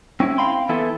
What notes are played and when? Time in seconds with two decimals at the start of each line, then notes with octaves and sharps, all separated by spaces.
0.20 C4 C#4 E4
0.38 C4 F5 G5 B5 C6
0.69 E3 B3 E4 A4